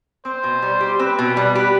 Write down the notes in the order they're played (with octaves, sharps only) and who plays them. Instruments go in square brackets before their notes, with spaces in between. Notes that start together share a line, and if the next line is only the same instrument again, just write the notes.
[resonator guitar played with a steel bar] C4 [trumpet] C5
[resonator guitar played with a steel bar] B2
G3
G4
[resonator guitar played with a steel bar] C4 [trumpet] B4
[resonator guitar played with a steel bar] B2
G3
G4